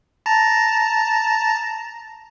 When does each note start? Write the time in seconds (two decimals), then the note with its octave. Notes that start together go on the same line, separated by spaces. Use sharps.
0.26 A5 A#5